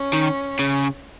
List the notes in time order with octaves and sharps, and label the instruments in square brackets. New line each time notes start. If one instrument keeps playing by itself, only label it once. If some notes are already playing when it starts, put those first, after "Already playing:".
Already playing: [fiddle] C#4
[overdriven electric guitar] D#3
C#3